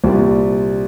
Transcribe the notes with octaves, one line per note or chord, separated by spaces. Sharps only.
C2 A#2 G3 C4